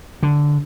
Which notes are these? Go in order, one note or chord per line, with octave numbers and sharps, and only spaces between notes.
D3